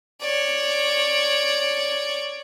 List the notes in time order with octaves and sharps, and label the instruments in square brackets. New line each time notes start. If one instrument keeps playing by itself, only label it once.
[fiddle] C#5 D5